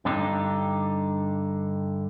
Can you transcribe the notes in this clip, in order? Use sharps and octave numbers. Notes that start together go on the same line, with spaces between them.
G2 D3 D4 D#4 G4